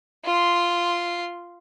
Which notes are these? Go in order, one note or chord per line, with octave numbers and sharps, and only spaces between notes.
F4 C6